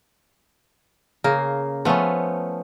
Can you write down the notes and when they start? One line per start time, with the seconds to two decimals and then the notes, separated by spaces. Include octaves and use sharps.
1.24 C#3 A#3
1.85 F3 A3 B3 C#4